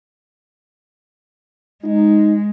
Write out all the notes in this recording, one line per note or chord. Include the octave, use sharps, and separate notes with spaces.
G#3 D#4